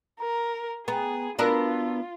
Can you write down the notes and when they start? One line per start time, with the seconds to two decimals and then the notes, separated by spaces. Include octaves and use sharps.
0.20 A#4 A#5
0.88 B3 G#4 G5 A#5
1.39 B3 D4 F4 F#4 A#4 A5 E6